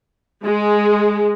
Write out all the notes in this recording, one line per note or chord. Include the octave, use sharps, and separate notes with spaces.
G#3